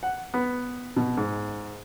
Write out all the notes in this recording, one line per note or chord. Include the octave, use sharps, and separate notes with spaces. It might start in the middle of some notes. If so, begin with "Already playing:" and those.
F#5
B3
B2
G#2